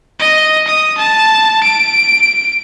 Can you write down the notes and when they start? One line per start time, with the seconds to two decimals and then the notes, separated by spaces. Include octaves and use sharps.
0.19 D#5
0.67 D#6
0.97 A5
1.63 D7